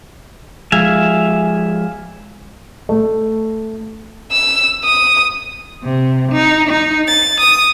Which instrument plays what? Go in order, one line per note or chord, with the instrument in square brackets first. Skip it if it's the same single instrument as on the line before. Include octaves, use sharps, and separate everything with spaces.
[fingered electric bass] F3 G#3 [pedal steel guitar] E5 F5 G#5
[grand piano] A3
[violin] E6
D#6
[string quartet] C3
D#4
D#4
A6
D#6